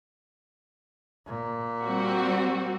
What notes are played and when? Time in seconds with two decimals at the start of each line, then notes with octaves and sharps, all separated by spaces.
1.26 A#2
1.83 G3 C4 F#4